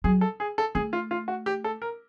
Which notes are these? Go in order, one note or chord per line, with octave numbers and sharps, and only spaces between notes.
F#3 G#4
A4
G#4
A4
A3 G#4
F4
F4
F#4
G4
A4
A#4